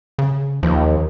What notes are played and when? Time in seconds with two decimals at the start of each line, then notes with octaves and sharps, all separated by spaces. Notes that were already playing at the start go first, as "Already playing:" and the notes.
0.19 C#3
0.63 D#2 F3